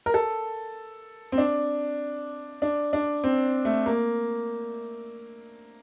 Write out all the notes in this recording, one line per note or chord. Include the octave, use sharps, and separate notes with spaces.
A#4
A4
C4
D4
D4
D4
C4
A3
A#3